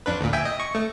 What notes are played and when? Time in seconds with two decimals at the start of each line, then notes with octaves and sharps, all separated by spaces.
0.06 F2 D4 B4
0.21 D2 A#2
0.33 E5 G5 G#5
0.45 D#5
0.60 C#6
0.75 A3